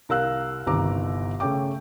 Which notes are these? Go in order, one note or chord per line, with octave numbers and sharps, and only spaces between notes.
C2 A#4 F5 E6 F#6
G1 C2 D#3 A#5 D6
C#3 A3 C#4 G5 D6